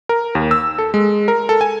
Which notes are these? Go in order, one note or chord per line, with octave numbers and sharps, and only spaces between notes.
A#4
D#2
E6
A4
G#3
A#4
A4
G#5